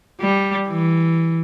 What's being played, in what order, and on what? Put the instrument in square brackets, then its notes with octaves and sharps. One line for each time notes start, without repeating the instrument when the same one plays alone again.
[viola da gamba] G3
E3